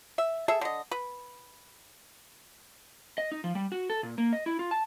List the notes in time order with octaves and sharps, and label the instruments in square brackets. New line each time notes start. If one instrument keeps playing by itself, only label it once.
[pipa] E5
G#4 A4 E5
D3 D#5
B4
[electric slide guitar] D#5
D#4
F3
G3
F#4
A4
A#2
A#3
D#5
E4
F4
A5